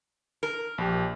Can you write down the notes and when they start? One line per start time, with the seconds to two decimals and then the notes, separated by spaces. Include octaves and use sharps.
0.43 A#4
0.78 A#1 G4